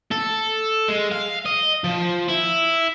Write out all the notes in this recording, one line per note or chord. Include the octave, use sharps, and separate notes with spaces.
A4
G#3
F5
D#5
F3
E4